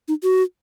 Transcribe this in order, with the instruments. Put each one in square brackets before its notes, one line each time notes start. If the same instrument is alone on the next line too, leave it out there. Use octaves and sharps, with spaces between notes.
[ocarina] D#4
F#4